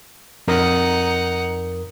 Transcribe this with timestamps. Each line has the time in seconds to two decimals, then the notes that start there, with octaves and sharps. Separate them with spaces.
0.48 F2 D#4 A#4 F#5 D#6